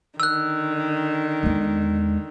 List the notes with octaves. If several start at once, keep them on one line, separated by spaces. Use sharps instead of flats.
D3 D#3 E6 F#6
E2 G#3